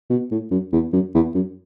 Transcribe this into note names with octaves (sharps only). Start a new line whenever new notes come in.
B2
A2
F#2
E2
F#2
E2
F#2